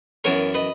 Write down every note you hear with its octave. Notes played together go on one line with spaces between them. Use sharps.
F#2 E3 B3 A#4 C#5
B4 D#5